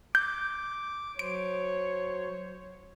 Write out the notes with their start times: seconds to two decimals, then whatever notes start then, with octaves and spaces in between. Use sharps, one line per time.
0.15 D6 G6
1.19 F#3 C5 C#5 D7